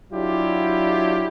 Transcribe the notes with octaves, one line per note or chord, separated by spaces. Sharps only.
F#3 D4 E4 F4 G4